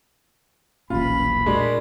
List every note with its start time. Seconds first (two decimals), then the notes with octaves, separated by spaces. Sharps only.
0.90 E1 B1 A#2 E3 C#4 F4 B5
1.46 A#2 G#3 D4 F#4 A#4